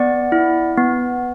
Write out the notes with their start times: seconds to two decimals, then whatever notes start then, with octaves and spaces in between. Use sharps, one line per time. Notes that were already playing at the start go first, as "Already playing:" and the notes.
Already playing: B3 D5 F#5
0.32 E4
0.78 B3